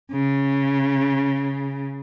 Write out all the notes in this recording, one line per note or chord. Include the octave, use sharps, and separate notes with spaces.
C#3